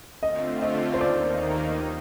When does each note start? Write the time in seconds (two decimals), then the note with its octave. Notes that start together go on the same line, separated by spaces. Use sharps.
0.23 D3 A3 C4 F4 D#5
0.62 D#5
0.94 C5
1.01 D#2 D#3 A#3 D#4 D5